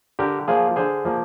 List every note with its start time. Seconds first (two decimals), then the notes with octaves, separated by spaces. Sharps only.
0.19 D3 G4 A#4
0.48 F3 A#3 F4 G#4
0.76 D3 G#4 C5
1.05 F3 A#3